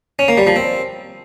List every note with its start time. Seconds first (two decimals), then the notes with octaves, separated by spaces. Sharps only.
0.19 C#4
0.28 A#3
0.38 G3
0.47 F3
0.56 C4